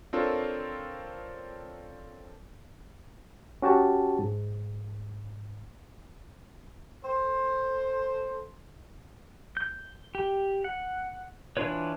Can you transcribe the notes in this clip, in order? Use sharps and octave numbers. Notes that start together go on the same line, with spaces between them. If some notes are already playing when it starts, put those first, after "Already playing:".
C4 D4 F4 A4 A#4 C#5
C#4 F#4 G4 A5
G#2
A4 C5
G6
G4
F#5
E3 D4 F4 B4 C#5